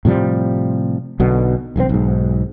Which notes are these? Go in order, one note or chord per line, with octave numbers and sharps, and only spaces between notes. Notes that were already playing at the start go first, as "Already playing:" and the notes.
A2 C3 F3 G3
B1 B2 D3
E1 B1 C3 C4
B1 G#2